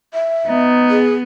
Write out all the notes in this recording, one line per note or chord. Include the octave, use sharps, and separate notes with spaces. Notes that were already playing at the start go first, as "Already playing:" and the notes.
E5
B3 D#4
G#4